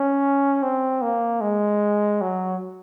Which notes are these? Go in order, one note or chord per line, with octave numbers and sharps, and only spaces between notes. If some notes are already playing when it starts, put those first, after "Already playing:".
Already playing: C#4
C4
A#3
G#3
F#3